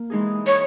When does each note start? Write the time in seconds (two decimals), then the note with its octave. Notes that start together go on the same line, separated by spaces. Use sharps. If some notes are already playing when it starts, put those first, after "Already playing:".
Already playing: A#3
0.10 E3 G#3 D#4 G#4
0.47 C#5